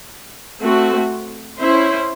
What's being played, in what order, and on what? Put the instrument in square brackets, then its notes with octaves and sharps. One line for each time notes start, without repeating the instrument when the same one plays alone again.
[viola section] A3 C4 F#4
C#4 E4 C5